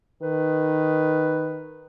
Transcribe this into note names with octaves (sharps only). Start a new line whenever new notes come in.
D#3 B4